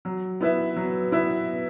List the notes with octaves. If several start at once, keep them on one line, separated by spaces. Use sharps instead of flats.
F#3
B3 E4 B4 E5
F#3
B3 E4 B4 E5